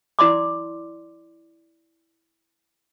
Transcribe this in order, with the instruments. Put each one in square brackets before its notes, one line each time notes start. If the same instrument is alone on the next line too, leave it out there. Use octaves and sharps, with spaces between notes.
[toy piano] E4 D5 C6 D6